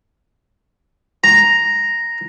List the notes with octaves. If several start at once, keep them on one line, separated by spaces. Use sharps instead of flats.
A#5